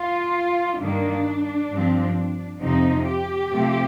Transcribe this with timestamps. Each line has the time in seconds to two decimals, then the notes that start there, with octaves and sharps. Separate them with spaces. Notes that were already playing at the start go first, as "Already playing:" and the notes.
Already playing: F4
0.80 G2 D#3 A#3 D4
1.70 G2 F3 C4
2.60 F2 C3 F3 C4 D#4
3.06 G4
3.51 C3 F3 A3 C4